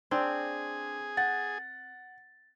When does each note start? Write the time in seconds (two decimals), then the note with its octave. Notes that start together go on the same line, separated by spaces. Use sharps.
0.11 C4 D4 G#4
1.17 F#5 A6